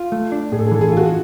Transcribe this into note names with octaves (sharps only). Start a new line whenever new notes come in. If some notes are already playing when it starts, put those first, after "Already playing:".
Already playing: F4
A3
D4
A2 G#4
A4
G#4
E3 A4
G#4
A4
F4 F#4 G#4